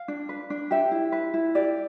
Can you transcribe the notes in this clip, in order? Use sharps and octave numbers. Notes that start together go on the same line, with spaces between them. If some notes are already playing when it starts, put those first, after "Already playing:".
Already playing: F5
D4
B4
D4
G4 E5
E4
B4
E4
G4 D5